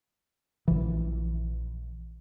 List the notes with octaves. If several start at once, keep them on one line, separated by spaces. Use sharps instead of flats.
A#1 E3